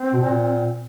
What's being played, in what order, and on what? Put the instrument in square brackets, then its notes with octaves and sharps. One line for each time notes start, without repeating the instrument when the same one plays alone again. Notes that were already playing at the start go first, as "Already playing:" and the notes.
Already playing: [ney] C4
[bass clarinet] B2
A#2